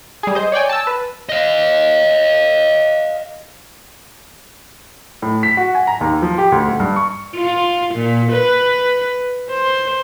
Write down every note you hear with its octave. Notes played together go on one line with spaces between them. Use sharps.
G3 G#4
C5 D#5
C#5 D5 G5 G#5
A5 E6
B4
D#5 F5
A2
B6
F#4
G#5
A#5
D#2
F3
G4
D2
D#1
G2
C#6
F4
A#2
B4
C5